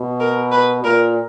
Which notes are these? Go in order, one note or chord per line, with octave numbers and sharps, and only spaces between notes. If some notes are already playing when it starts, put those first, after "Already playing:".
Already playing: B2
A#4
B4
A#2 A#4